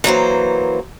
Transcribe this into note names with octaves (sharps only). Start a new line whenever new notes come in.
E3 F#3 A#3 C5